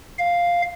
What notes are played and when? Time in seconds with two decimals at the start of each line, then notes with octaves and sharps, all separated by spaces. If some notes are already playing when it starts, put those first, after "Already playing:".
0.19 F5